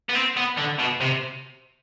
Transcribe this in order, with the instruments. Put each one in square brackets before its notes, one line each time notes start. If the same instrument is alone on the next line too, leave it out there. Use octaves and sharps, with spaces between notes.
[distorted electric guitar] B3
C4
B3
D3
B2
C3